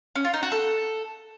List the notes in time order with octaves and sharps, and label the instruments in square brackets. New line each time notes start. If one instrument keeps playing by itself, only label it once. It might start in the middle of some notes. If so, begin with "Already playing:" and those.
[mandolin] C#4
F4
D#4
F#4
A4